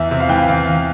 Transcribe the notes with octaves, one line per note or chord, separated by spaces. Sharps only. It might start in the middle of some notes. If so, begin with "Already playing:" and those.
Already playing: E2 E5
C3
F5
E3 G5
F5
E2 F5
E2